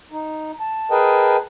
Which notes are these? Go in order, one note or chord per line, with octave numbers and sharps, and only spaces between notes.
D#4
A5
G#4 A#4 B4 D#5 G5 A5